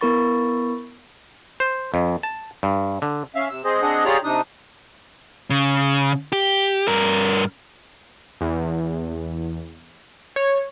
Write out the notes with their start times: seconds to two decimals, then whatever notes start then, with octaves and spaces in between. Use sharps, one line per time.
0.01 B3 E4 A#4 B5 C#6 A6
1.60 C5
1.94 F2
2.23 A5
2.63 G2
3.02 D3
3.35 C#4 E5 F5
3.49 C3 E6
3.64 G#3 C4 G#4 C5 D#5
3.82 C4 D4 G#4 D#5 F#5
4.05 F4 G4 G#4 C#5 D5 A#5
4.24 C3 D4 D#4 D#6
5.50 C#3
6.32 G4
6.88 G2 A#4
8.41 E2
10.36 C#5